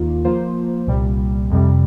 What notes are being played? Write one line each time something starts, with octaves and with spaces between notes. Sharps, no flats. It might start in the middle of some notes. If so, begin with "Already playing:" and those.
Already playing: D#2 D#3 A#3 F4
F3 A#3 F4 C5
C2 A#2 G3
F2 C3 G3